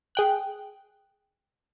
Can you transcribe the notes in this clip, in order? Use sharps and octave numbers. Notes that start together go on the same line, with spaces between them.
G#4 G5 F#6